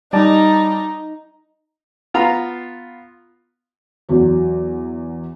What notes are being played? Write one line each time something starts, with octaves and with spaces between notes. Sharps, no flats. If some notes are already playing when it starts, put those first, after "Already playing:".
G3 D#4 D5 A5
B3 F4 F5 A#5
E2 F#3